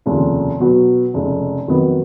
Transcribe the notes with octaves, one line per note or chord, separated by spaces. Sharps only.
F1 D#2 C#3 F3
B2 F#3 B3 F#4
F1 F2 C#3 G#3 D#4
F2 D#3 F#3 B3